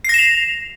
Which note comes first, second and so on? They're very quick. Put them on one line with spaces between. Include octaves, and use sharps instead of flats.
C7 A#6 E7 F7